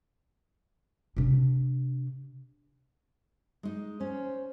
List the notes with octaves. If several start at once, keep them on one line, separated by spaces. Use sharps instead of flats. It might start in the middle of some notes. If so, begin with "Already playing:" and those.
C3 D4
G#3 D#4
C#4 C5